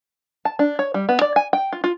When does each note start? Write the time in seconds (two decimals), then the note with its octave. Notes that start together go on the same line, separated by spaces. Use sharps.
0.45 A5
0.59 D4
0.79 C#5
0.94 G3
1.09 B3
1.21 D5
1.36 G#5
1.53 G5
1.73 F4
1.84 F4